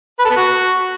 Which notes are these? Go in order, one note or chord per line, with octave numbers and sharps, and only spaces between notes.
B4
A4
B3
F#4